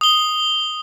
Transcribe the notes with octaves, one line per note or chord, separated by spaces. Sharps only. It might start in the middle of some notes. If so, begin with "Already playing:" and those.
D#6 G7